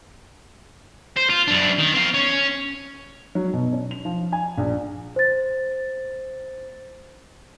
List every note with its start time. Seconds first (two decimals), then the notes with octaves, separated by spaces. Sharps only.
1.17 C5
1.30 F4
1.48 F#2 D4
1.78 D#3
1.93 C4 F5
2.14 C#4
3.35 F#3
3.53 B2
3.73 C#4
3.91 F7
4.05 F3
4.32 G#5
4.57 A#1
5.16 C5 A6